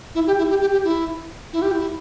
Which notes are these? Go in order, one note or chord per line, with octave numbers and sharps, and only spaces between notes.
E4
G4
E4
G4
G4
G4
E4
E4
G4
E4